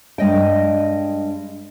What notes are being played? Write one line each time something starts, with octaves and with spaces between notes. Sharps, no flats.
G2 G#3 D#5 G5